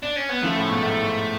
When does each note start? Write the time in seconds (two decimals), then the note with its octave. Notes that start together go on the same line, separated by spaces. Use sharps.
0.03 D4
0.16 C#4
0.29 B3
0.42 C#3 F3 A3
0.56 A2 C#3
0.69 G#2 B2
0.81 F#2 A2
1.02 G#2